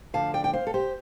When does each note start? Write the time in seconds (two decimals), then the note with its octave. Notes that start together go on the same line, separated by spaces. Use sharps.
0.13 D2 D3 F3 F5 A5
0.34 D5 G5
0.44 G5
0.53 C5 F5
0.67 A4
0.74 G4 C5